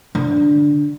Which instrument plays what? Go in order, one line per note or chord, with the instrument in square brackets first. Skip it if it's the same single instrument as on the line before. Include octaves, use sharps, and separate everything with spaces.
[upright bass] D3